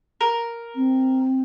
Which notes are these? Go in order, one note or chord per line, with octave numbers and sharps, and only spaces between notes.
A#4
C4